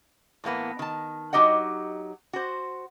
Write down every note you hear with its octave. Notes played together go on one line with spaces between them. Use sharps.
A2 E3 A#3 B3
D#3 A5
F#3 D#4 G4 D#5 F#5
F#4 C5